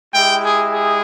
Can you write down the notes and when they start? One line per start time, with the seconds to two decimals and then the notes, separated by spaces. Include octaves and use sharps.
0.13 G#3 E4 G4 G5
0.42 G#4
0.70 G#4